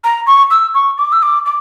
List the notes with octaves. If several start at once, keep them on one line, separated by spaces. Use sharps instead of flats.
A#5
C#6
E6
C#6
D6
E6
D6
D6